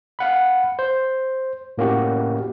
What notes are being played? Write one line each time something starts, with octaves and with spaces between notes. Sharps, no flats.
F5 F#5 B5
C5
A2 A#3 C#4 F#4 G4